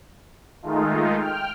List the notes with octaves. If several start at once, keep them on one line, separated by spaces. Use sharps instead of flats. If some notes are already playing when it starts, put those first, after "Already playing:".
D#3 G#3 A3 D#4 F4
G5 F6